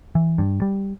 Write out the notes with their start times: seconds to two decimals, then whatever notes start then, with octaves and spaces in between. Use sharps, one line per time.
0.15 E3
0.38 G2
0.62 G3